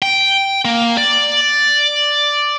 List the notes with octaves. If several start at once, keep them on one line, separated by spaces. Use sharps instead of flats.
G5
A#3
D5